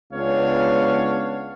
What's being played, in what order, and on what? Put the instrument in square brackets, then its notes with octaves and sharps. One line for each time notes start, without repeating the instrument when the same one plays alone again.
[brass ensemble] C#2 B3 C#4 D4 C#5 F5